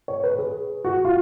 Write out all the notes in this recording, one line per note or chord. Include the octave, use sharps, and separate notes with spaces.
C#5
B4
G#4
F#4
F4